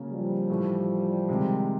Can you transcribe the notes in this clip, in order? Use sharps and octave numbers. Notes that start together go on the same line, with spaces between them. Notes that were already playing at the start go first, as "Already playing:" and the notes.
Already playing: C#3 F#3 A#3 C#4
F3 G3
A2 E3 A3
C3 D#3 G#3